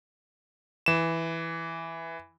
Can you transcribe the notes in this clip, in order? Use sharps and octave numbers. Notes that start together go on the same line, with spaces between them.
E3 E7